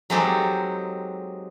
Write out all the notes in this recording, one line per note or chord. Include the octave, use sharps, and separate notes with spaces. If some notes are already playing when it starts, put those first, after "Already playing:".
F#3 G#3 C4 D#4 G4 A4